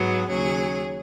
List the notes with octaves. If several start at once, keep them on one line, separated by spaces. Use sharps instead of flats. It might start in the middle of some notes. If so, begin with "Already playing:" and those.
Already playing: G#2 F#3 B3 G#4
D#2 C#3 F#3 C#4 G#4